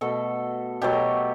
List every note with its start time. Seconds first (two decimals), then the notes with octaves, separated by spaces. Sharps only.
0.01 B2 A3 A4
0.81 B2 F#3 A3 G4